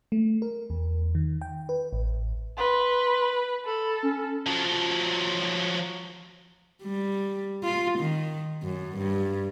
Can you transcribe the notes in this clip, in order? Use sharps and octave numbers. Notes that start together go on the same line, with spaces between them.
A3
A#4
E2
D#3
G5
B4
A1
B4 C6
A4 B5
C#4
F3 F#3
G3
F4
D#3
F#2
G2